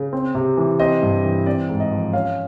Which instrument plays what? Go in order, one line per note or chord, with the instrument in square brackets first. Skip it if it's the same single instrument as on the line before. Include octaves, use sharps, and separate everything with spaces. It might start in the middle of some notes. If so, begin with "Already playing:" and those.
Already playing: [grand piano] C#3
C4
C3
E3
C4 D#5
G2
E3
C4 D5
G#2
D#5
F3
C#4 F5